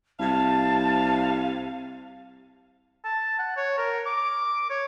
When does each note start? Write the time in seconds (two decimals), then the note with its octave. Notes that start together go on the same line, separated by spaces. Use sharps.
0.19 C2 C3 F5 A5
3.05 A5
3.38 F#5
3.57 C#5
3.78 A#4
4.06 D6
4.70 C#5